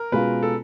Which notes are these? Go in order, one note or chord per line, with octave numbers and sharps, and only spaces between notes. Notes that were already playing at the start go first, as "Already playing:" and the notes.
Already playing: A#4
B2 G#3 C#4 F4 B4
A4